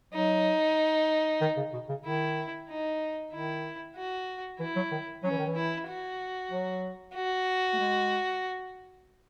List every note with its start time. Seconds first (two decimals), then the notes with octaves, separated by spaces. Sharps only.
0.14 F#3 D#4
1.41 D#3
1.57 C#3
1.73 B2
1.89 C#3
2.05 D#3 E4
2.69 D#4
3.32 D#3 E4
3.96 F#4
4.59 E3 E4
4.76 F#3
4.91 D#3
5.24 F#3 C#4
5.31 E3
5.38 D#3
5.46 E3
5.55 E4
5.88 F#4
6.51 F#3
7.15 F#4
7.73 A3
7.79 G#3